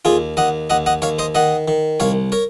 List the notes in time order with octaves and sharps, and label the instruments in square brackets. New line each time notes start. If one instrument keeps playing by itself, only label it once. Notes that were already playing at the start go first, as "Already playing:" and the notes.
[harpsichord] D#2 F4 G#4
D#2 D#5 F#5
D#2 D#5 F#5
D#5 F#5
D#2 C#5 F5
C5 D#5
D#3 D#5 F#5
D#3
C2 C#5 F5
A#4 C#5